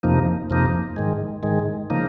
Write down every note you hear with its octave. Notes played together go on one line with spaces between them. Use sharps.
F2 C3 F3 A#3 D#4
F2 C3 F3 A#3 D#4
G#2 D#3 G#3
G#2 D#3 G#3
C#3 F3 A#3 D#4